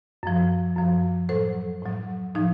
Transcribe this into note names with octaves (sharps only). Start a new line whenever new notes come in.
F#2 F3
F#2 F3
A2 F#3 A4 C5
A2 F#3
A2 F3 D#4